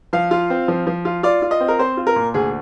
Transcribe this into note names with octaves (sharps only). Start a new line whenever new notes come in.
F3 F5
F4
C4
F3
F3
F4
F4 D5
F4
D#5
C4
A#4
C4 C5
F4
A#4
A#2
D2 G#4